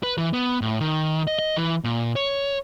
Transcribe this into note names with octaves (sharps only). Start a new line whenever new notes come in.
B4
E3
B3
A2
D#3
D#5
D#5
E3
A#2
C#5